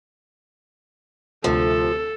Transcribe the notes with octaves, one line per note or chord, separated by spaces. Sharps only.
D2 C3 F3 A3 A4